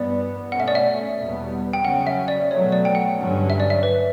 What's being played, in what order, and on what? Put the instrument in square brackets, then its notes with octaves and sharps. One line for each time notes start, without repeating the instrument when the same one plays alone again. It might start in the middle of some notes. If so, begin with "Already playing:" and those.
Already playing: [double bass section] G2 E3 B3 [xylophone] D5
[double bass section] B2 A3 C#4 [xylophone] F#5
[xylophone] E5
D5
E5
[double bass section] E2 B2 G3 B3
[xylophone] G5
[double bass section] C#3 F#3 C#4 [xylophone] F#5
[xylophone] E5
D5
[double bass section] B2 F#3 A3 [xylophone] C#5
[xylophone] D5
G5
F#5
[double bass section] G2 D3 F#3 C#4
[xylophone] E5
D5
E5
B4